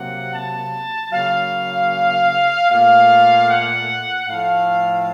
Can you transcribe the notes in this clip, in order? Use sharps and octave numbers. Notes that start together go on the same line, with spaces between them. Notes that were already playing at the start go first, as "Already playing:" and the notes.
Already playing: C3 F#3 A#3 F#5
A5
C#3 F#3 A#3 F5
A#2 A3 F5
F#5
A2 F3 A3 F5